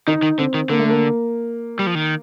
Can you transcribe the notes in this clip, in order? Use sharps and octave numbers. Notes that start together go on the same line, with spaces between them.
D#3 D#4
D#3
D3 C4
D#3
D3 A#3
A3
A#3
G3
F3
D#3